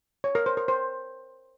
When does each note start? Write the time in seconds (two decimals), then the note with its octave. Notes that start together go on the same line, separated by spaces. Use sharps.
0.24 C#5
0.35 A#4
0.46 C5
0.57 A#4
0.68 C5